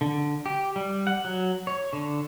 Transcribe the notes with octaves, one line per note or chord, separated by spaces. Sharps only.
D3
G4
G3
F#5
F#3
C#5
D3